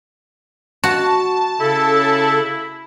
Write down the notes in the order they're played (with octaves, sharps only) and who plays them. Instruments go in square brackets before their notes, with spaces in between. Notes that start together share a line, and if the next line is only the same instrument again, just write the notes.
[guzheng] F#4 [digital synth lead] A5
[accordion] C#3 A4 [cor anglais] E4